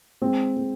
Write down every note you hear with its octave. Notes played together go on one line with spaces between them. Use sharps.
G#3 C4
G#3